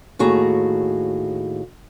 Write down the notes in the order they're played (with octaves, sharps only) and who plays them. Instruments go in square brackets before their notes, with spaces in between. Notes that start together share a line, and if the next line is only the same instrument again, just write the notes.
[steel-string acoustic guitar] D#2 A2 F#4 G#4 A#5